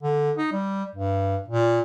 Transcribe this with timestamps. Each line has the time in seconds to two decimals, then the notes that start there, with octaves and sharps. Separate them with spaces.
0.03 D3
0.37 D#4
0.52 G3
0.96 G2
1.48 A#2